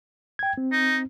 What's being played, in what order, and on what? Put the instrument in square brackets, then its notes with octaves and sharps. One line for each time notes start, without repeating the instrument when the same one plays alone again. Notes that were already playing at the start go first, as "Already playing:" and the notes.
[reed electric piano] G5 G#6
C4
[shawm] D#4